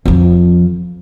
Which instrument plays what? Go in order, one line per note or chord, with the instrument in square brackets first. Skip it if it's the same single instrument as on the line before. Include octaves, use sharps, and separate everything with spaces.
[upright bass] F2 F3